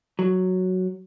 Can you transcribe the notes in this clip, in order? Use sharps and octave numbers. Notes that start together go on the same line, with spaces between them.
F#3